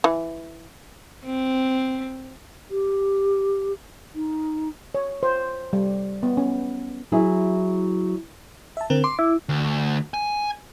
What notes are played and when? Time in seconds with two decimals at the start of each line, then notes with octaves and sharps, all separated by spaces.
0.04 E3
1.26 C4
2.70 G4
4.14 D#4
4.95 C#5
5.23 C5
5.73 G3
6.23 B3
6.37 C#4
7.12 F#3 E4 G#4
8.77 E5 A5
8.90 D3 C4 A#4
9.04 C6 D6
9.19 E4
9.49 D2
10.14 G#5